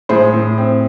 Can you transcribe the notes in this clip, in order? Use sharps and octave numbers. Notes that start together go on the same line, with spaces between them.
A2 G#4 C5
A2
C4